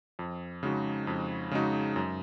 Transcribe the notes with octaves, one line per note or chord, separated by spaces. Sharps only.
F2
C#3 G#3 D#4 F#4
F2
C#3 G#3 D#4 F#4
F#2